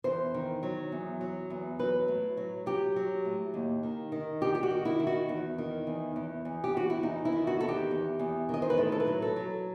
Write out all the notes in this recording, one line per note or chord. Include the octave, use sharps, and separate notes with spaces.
E2 C5
D#3
F#3
E2
F#3
E2
F#3 B4
A2
F#3
F#3 G4
F#3
A2
D#2
D#3
D#3
G3 G4
G4
F#4
D#3
E4
D#3
F#4
E2
D#3
E2
E2
E2
G4
E2 F#4
E4
E2 D#4
E4
D#3
F#4
E2 A4
G4
E2
E2
D#3 D#5
C5
B4
A2 A4
A4
B4
F#3
A4
F#3